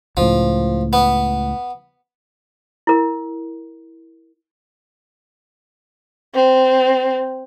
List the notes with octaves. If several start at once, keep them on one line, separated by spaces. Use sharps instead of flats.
C#2 A2 F3
B3
E4 A#4
C4